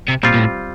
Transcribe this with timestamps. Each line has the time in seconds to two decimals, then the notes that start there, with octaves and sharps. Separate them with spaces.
0.08 C3
0.23 A#2 G3 C4 F4
0.34 A#2
0.39 A2